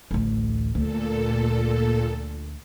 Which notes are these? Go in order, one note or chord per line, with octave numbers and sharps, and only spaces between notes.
A1 D2
D2 A#2 A4